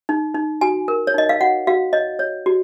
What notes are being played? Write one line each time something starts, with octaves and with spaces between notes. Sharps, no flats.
D#4
D#4
F#4 G#5
A#4
C#5
D#4 D#5
F5
F#4 F#5
F#4 F5
C#5 D#5
C#5
F#4